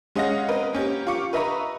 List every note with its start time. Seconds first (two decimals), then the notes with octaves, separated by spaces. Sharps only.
0.15 G#3 C#4 D#5 F5 F#5 A#6
0.49 C4 A#4 B4 D#5
0.73 A#3 C#4 G4
1.07 F4 G4 C#6 D6 C#7
1.33 B4 D#5 E5 A#5 B5 C#6